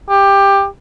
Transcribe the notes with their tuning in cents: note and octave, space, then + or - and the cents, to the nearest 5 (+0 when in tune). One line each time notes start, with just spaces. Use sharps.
G4 +15